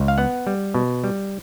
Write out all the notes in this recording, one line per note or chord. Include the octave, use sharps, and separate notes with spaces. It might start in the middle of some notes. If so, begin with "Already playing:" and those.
Already playing: C#2
F5
B3 F#5
G3
B2
G3